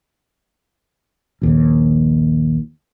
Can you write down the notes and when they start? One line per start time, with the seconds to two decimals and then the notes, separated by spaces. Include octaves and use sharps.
1.42 A#1 D#2